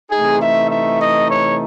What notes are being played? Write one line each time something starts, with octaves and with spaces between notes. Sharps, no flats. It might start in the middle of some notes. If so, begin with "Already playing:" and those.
C3 E3 A3 D#4 G#4
E5
E5
D#5
C#5